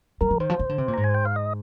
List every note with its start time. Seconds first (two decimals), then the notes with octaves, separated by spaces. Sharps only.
0.21 G3 A#4
0.31 F3
0.40 D#3 C5
0.50 F3
0.59 D#3
0.69 D3
0.78 C3
0.88 A#2
0.94 G#2 A#5
1.04 G#5
1.14 G5
1.25 F5
1.36 D#5